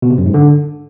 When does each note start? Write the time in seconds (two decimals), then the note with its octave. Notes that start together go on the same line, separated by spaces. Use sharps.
0.02 B2
0.10 C3
0.18 F#2
0.26 G#2
0.34 D3